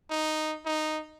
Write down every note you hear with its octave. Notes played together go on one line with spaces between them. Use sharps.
D#4
D#4